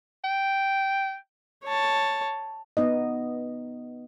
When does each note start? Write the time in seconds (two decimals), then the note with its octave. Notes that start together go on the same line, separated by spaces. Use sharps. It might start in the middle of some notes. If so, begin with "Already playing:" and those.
0.24 G5
1.65 C#5 A5
2.77 B3 D#4 D#5